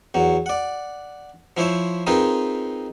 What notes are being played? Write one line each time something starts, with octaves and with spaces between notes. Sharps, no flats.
E2 F#3
D5 F#5
F3 E4 C5 C#5 E5
C4 D#4 F4 G#4 A#4 B4